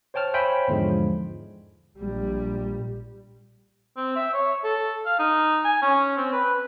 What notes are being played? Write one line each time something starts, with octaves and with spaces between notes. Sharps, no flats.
C5 C#5 G5 A5 F6
C5 C#5 E5 G5 G#5 B5
E2 G#2 D3 F3 G#3
A#1 G3
C4
E5
C#5
A4
F5
D#4
G#5
C#4
C4
B4